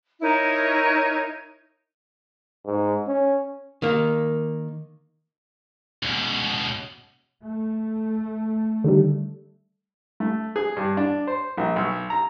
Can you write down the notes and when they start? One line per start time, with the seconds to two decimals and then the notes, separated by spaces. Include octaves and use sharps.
0.21 D#4 E4 A#4 C#5
2.66 G#2
3.07 C#4
3.82 D#3 A#3
6.03 C#2 B2
7.43 A3
8.84 D3 D#3 G3
10.20 A3
10.56 G#4
10.77 G2
10.97 D4
11.27 C5
11.57 A#1
11.76 B1
12.10 A#5